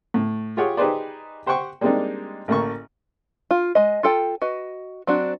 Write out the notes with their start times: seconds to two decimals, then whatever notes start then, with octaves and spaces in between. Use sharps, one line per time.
0.14 A2
0.57 F4 G4 G#4 C#5 F#5 G5
0.77 D#4 G4 G#4 B4 C5 D5
1.46 G4 C5 F#5 G5 C#6
1.81 G3 G#3 A#3 C4 D4 D#4
2.48 A1 A3 A#3 C#6
3.51 F4
3.75 G#3 D#5
4.03 F4 A4 G5
4.42 F#4 B4 D#5
5.07 F#3 C4 D4 F#4